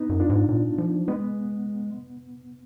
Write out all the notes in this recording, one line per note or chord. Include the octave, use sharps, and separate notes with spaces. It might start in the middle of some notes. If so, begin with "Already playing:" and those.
Already playing: B3 D#4
F#2
D4 F4
G#2
A#2
F3
G#3 B3